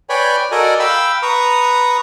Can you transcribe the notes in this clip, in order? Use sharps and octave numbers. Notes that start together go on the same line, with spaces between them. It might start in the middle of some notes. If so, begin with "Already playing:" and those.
B4 C#5 D5 G5 G#5 B5
F#4 A4 A#4 D5 D#5 G#5
F5 G5 B5 E6
B4 A#5 C#6 D#6